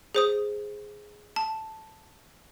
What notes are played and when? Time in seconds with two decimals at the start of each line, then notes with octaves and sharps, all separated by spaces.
0.15 G#4 C5 D#6
1.36 A5